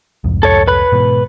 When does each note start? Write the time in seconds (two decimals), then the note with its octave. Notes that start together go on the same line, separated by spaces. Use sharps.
0.24 C2 F2 G#2
0.43 A4 C#5
0.68 B4 B5 F#6
0.92 G#2 B2 E3